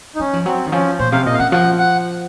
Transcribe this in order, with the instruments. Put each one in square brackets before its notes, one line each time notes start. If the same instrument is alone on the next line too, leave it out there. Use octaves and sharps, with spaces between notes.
[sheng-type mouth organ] D#4
[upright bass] F#3 [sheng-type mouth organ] C#4
[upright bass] F3
[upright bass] F#3 [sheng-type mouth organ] C4
[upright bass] D#3
[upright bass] F3 [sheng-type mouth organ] C#4
[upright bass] A#2 [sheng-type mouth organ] C5
[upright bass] C3 [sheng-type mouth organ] F5
[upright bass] A#2 [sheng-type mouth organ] D#5
[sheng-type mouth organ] F5
[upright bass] C#3 [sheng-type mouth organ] F#5
[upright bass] F3 [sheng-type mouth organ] F#5
[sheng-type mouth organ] F#5